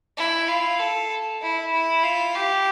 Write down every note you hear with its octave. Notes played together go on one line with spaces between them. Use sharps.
E4
F4
A4
E4
E4
F4
G4